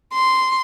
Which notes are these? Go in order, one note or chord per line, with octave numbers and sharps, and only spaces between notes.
C6